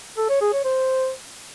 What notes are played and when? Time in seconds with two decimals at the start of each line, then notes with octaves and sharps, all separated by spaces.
0.17 A4
0.29 C#5
0.41 G#4
0.53 C#5
0.65 C5